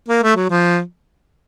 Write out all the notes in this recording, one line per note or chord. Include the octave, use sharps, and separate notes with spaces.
A#3
A3
F#3
F3